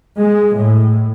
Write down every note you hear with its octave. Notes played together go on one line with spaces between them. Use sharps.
G#3
A2